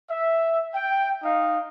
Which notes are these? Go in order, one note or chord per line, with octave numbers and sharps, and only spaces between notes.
E5
G5
D#4 F5